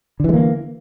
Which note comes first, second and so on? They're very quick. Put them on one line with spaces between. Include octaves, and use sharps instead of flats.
D3 E3 G#3 A#3